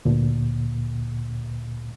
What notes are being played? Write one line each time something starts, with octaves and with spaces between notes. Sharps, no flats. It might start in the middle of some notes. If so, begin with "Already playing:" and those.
D2 A#2